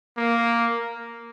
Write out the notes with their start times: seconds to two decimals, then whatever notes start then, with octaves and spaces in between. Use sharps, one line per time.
0.17 A#3